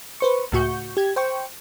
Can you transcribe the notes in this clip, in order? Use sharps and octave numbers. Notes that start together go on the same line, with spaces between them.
B4 C5 C#6
C#2 A2 F#4 C#6 G6
G4 G#6
C5 G5 C#6